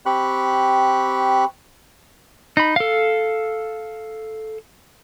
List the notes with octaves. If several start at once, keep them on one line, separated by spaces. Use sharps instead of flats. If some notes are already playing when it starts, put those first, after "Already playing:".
C4 G4 B5 C#6 F#6
D#4 B5
A4 F5